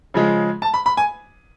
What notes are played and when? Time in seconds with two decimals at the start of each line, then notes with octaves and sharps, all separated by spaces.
0.14 C#3 F3 G#3
0.62 A5
0.74 B5
0.86 B5
0.97 G#5